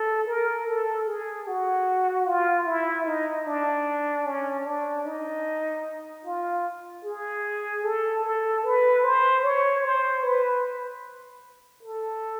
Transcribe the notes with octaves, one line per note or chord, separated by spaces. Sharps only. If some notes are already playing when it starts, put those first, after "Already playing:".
Already playing: A4
A#4
A4
G#4
F#4
F4
E4
D#4
D4
C#4
D4
D#4
F4
G#4
A4
A4
B4
C5
C#5
C5
B4
A4